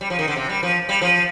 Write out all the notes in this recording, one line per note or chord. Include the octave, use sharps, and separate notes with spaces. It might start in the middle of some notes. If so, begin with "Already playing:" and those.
G3
F3
D#3
D3
C3
G3
F3
G3
F3